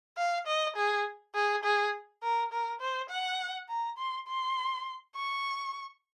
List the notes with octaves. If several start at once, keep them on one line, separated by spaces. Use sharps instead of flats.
F5
D#5
G#4
G#4
G#4
A#4
A#4
C5
F#5
A#5
C6
C6
C#6